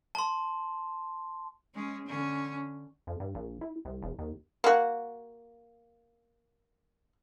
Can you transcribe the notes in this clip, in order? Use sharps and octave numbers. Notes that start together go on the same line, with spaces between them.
A5 C6
G#3 C#4
D3 C#4
F2
G2
A#1
E4
C2
E1
D#2
A#3 F#4